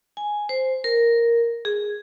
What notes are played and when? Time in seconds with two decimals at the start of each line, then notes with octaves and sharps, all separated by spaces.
0.17 G#5
0.49 C5
0.84 A#4
1.65 G#4